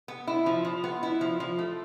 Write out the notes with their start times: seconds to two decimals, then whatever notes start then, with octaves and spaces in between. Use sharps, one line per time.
0.08 B3
0.27 E4
0.46 F3
0.65 F3
0.84 B3
1.03 E4
1.21 F3
1.40 F3
1.59 A3